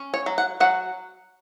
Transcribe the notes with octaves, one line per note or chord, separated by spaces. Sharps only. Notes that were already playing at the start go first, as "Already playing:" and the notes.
Already playing: C#4
C#5
F#3
F#5
F#3 F#5